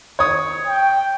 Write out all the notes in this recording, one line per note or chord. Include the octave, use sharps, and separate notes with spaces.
C#5 D#6
G5